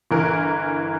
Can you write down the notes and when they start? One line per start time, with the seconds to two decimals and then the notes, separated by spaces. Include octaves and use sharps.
0.11 G1 E3 A#4